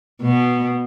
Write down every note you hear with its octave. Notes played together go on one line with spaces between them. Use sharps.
B2